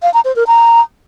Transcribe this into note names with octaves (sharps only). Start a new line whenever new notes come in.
F5
A#5
C5
A#4
A#5